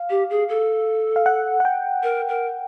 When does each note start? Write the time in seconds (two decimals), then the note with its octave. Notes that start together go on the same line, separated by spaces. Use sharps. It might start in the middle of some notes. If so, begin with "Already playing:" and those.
Already playing: F5
0.10 G4
0.30 G#4
0.49 A4
1.16 F5
1.26 F#5
1.60 F#5
1.65 G5
2.03 A#4
2.29 A#4